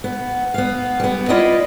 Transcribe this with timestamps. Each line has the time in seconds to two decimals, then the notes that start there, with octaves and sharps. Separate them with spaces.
0.04 B3
0.54 B3 F5
1.00 G3 B3
1.29 E4 F4 B4 D5 D#5